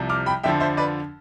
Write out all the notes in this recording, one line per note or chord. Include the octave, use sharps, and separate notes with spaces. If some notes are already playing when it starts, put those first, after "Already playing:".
Already playing: C2 C3 F3
D6 F6
G5 B5
F2 D3 F3 E5 G5
C5 E5
B4 D5